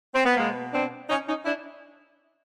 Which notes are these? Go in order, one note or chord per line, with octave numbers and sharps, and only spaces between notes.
C4
B3
B2 G#3 A#3
C4 D4
C#4 D#4
C#4 D#4
D4 E4